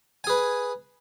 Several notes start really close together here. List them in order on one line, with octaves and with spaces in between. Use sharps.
G#5 G#4 B4